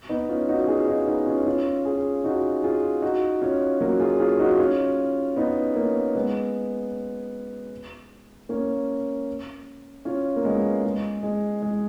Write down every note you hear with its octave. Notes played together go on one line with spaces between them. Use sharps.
B3 D#4
C#4 F4
D#4 F#4
F4 G#4
D#4 F#4
B3 D#4
C#4 F4
C#4 F4
F4 G#4
D#4 F#4
F4 G#4
D#4 F#4
C#4 F4
F#3 A#3
F4 G#4
F4 G#4
D#4 F#4
C#4 F4
B3 D#4
A#3 C#4
G#3 B3
A#3 C#4
C#4 F4
A#3
G#3 B3
G#3
G#3
G#3